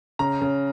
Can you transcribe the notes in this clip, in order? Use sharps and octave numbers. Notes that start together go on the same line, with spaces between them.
C#3 A#5
C#3